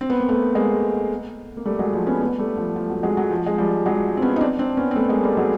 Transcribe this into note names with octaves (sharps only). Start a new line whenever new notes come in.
C4
B3
A#3
A3 B3
G#3 A#3
A#3
G3 A3
F#3 G#3
F3 G3
B3 C#4
A3 B3
G3 A3
F3
F3
F#3
F#3 G#3
F#3
F3
G#3
F3 G3
F#3 G#3
C4
B3 C#4
D#4
C4 D4
C4 D4
B3 C#4
C4
A3 B3
G#3 A#3
G3 A3
F#3 G#3